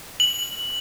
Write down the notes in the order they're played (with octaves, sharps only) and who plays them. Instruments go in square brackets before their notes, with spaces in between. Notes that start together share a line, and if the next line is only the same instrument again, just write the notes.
[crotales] F#7